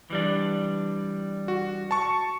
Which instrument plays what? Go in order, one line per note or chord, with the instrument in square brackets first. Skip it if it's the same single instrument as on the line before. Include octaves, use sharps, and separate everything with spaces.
[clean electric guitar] E3 G3 D4
[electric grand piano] F#4
A5 C#6